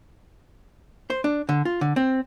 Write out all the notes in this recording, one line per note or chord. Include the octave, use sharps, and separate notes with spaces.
C5
D4
D3
F4
D3
C4